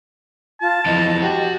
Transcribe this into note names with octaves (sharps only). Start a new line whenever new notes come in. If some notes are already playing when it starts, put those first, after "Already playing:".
F4 A5
F2 E3 D#5
F#4 G4